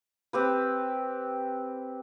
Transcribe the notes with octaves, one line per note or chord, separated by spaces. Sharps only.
C4 G4 B4